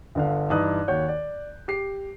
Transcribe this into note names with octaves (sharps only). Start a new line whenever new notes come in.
G1 D3 F5
G2 E3 D#4 B4 D#6 F#6
D#2 F#4 C#5 G6
D5
G4 C7